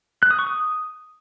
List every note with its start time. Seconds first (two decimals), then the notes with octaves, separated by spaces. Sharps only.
0.23 F#6
0.31 D#6
0.39 C#6
0.47 D#6